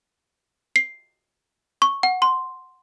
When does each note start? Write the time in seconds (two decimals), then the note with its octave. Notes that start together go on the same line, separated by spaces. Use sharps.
0.76 C7
1.82 C#6
2.03 F#5
2.22 C6